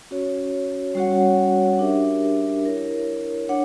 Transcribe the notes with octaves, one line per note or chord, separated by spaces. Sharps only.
C#4 F#4 C#5
G3 C#4 F#4 C#5 F#5
D4 G4 A#4 E5
E4 A#4 C#5
D4 C#5 F#5